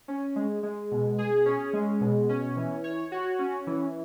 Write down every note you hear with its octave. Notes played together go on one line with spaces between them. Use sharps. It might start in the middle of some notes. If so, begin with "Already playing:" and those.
C#4
G#3
G#3
B2
G#4
C#4
G#3
B2
C#4
E3
C#5
F#4
C#4
E3